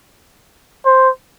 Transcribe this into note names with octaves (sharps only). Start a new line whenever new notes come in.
C5